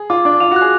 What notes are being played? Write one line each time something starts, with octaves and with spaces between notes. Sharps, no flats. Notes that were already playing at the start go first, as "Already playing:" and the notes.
Already playing: G#4
F4 D6
D4 D6
F4 F7
F#4 F#6
G#4